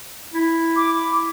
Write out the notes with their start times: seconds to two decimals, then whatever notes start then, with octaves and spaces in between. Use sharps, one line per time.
0.33 E4
0.76 D6